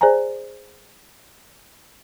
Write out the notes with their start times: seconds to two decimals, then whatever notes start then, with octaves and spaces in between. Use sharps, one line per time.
0.01 G#4 C5 D5 G#5 A#5